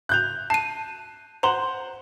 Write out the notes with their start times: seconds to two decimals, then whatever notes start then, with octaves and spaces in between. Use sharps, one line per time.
0.09 F#6 G6 F7
0.50 A5 C7 D#7
1.43 C5 F#5 A#5 C6 F#7